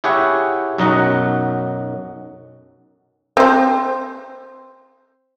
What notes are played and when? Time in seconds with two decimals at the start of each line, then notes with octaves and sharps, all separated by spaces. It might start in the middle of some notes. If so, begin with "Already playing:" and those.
0.04 E4 G4 G#4 C#5 F#5
0.78 B1 F#2 F#3 D#4 D#5 F#5
3.37 C4 C5